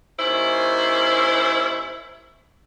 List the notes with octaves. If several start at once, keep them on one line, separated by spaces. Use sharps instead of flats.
D#2 C#4 E4 C5